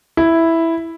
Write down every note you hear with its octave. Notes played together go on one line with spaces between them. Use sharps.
E4